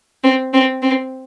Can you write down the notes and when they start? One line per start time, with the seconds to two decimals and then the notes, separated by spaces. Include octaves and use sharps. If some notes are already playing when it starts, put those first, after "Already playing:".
0.23 C4
0.53 C4
0.82 C4